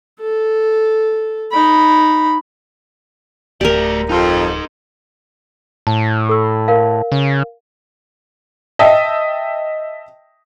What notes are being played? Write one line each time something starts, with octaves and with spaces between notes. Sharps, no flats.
A4
D#4 B5
D1 A3 G4 A#4 D5
F2 D#4 C6
A2 A5
A4 E6
A#4 F5
C#3
D#5 E5 G5 A5